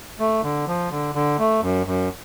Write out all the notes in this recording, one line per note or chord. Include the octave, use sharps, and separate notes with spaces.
A3
D3
F3
D3
D3
A3
F#2
F#2